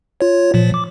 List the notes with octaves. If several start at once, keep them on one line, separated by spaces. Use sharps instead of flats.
F4 C#5
A#2 F3
D6